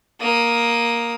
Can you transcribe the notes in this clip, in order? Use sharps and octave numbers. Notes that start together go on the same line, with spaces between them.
A#3 D#6